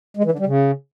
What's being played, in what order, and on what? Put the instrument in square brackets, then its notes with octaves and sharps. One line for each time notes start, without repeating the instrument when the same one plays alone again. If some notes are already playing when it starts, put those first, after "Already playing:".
[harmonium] G#3
E3
D3
G3
C#3